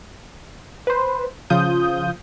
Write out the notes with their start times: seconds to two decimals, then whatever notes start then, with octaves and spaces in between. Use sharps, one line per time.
0.87 B4 C5
1.50 C#3 F3 F4 D#6 G6